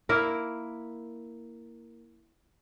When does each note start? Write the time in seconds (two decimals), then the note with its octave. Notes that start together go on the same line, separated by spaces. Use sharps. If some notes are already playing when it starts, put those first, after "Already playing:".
0.09 A#3 E4 A#4